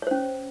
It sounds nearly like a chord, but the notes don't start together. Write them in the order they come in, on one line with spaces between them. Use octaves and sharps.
C#5 C5 C#4